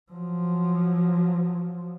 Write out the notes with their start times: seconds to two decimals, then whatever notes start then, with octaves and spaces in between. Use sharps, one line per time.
0.12 F3 F#3